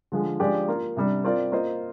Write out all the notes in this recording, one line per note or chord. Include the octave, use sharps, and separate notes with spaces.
D3 F3 G#3
F3 G#3 D4 G4 D5
A#3 F4 A#4
C3 G3 D4
C4 F4 A#4 D5
A#3 F4 C5 D#5